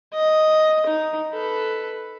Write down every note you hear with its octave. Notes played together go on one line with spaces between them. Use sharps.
D#5
D#4
A4 B4